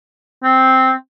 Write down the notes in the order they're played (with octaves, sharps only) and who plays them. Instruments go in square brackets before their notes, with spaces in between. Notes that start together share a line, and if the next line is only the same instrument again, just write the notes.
[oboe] C4